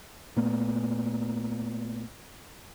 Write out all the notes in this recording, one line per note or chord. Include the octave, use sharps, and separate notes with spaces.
A#2 A3 B3